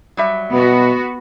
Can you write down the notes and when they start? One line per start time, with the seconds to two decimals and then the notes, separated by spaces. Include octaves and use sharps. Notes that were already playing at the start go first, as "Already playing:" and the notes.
0.17 F#3 G3 E5
0.53 B2 B3 F#4